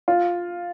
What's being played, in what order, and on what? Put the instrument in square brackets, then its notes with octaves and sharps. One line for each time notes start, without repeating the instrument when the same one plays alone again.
[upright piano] F4